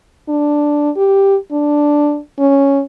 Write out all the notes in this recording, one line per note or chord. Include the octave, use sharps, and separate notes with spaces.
D4
G4
D4
C#4